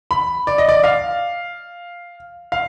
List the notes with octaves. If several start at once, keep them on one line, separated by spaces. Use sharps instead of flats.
B5
D5
D#5
D5
F5
F5